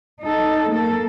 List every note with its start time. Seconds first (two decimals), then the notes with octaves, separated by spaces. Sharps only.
0.22 D#4 A4
0.70 A#3 A4